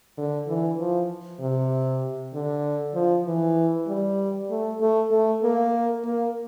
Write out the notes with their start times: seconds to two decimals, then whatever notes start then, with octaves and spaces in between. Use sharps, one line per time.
0.18 D3
0.48 E3
0.79 F3
1.40 C3
2.34 D3
2.95 F3
3.26 E3
3.88 G3
4.50 A3
4.81 A3
5.11 A3
5.43 A#3
6.04 A#3